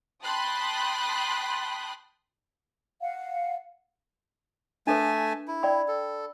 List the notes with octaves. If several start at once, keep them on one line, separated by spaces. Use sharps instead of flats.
G5 A5 B5 C6 D#6 F#6
F5 F#5
A3 D4 A4 B4 G#5 A5
E4
D5 G5 B5
A4